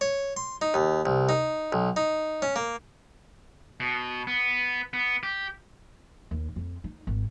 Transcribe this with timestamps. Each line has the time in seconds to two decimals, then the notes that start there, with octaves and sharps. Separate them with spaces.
0.01 C#5
0.37 C6
0.62 D#4
0.74 D#2
1.06 C2
1.29 D#4
1.72 B1
1.96 D#4
2.42 C#4
2.56 A#3
3.80 B2
4.27 B3
4.94 B3
5.23 G4
6.31 D#2
6.56 F2
6.84 D#4
7.07 G#1